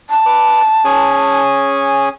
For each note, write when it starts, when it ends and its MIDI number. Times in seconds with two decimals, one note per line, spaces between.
0.10 1.38 81
0.26 0.62 71
0.26 0.62 86
0.85 2.09 61
0.85 2.09 68
0.85 2.09 80